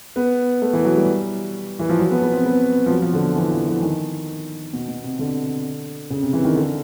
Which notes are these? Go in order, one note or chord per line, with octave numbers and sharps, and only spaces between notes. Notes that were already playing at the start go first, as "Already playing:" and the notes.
B3
A3
E3
F#3
G3
E3
F3
F#3
B3
B3
C4
B3
F3
F#3
F3
D3
B2
E3
F3
E3
D#3
B2
B2
C3
D3
C#3
C3
E3
D#3
D3